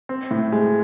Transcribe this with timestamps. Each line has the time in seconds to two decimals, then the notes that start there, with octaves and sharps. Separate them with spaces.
0.09 C4
0.31 A2
0.53 G#3